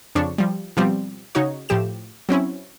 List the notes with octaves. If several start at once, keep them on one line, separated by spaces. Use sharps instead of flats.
F2 C#3 D4 C#6
F3 G3
B2 F3 G3 C4
C#3 D#4 F#4 C#5
A2 F3 G4 E7
F#3 C4 C#4 E4